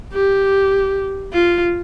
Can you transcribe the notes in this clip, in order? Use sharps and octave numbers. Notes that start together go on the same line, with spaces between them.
G4
F4